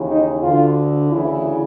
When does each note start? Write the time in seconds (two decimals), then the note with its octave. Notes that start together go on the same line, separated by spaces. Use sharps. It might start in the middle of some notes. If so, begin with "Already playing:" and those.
Already playing: D#2 C#3 E3
0.10 D#4
0.43 D2 D3 F4
1.12 D2 C#3 E3 E4